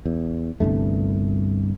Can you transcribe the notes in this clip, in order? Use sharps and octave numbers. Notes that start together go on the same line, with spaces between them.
E2
G1 C2 G2 A3